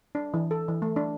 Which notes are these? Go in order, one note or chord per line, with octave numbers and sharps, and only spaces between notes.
D4
E3
A4
E3
A3
D4